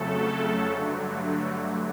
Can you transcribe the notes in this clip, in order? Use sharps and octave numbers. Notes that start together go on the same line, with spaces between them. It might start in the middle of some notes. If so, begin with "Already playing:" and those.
Already playing: F2 C#3 F#3 A3 A4
G2 D3 F#3 A3